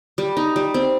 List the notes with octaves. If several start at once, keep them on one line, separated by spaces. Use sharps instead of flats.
G3
D#4
G3
C4